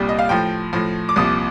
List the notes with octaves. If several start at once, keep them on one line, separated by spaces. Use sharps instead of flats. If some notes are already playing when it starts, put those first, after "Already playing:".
Already playing: C2 A#2 G3
D#5
F5
A2 F3 G5
A2 F3
D6
C2 A#2 F3 D#6